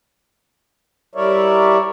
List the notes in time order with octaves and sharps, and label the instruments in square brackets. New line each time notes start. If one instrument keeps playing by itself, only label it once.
[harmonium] G3 E4 A#4 C#5 D5 E5